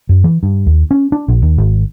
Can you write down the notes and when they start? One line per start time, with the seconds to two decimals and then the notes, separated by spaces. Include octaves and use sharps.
0.09 F#2
0.24 E3
0.43 G2
0.67 D#2
0.91 C#4
1.12 D4
1.28 A#1
1.42 D#2
1.58 G#1